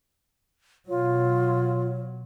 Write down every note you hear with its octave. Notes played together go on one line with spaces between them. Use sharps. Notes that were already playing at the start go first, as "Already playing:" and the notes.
B2 F#3 F4 C#5